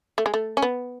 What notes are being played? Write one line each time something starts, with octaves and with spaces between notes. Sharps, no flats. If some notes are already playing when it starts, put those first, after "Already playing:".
A3
G#3
A3
C#4
B3